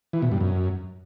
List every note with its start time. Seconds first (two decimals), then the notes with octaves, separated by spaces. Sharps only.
0.13 E3
0.22 B2
0.31 G2
0.40 F#2